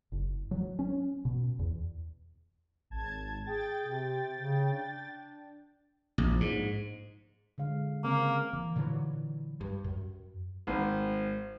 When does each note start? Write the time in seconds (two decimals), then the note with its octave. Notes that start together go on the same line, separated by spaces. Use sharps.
0.12 F#1
0.51 F#3
0.79 C#4
1.25 B2
1.59 E2
2.90 G#1 A5 G#6
3.45 G#4 G5 A6
3.86 C3
4.38 C#3
4.73 D4
6.18 A#1
6.40 G#2
7.58 D3 G#3 F5
8.04 C#3 A#3 C4 F5
8.53 E3
8.76 A#2 D3 E3 F#3
9.61 G2
9.84 F#2
10.67 G#1